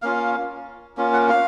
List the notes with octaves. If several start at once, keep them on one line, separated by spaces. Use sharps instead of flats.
A#3 C#4 F4 F5
A#3 C#4 F4
F#5
F5